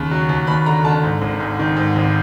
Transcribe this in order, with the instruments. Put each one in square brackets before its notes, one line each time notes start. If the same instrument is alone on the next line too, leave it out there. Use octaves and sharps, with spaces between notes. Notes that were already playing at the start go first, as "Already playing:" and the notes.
Already playing: [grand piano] D#2 C#3
F#3
D#2
D#2 B5
D3 A#5
D3 A5
G#2
G#1
G#2
D#3
G#2
G#1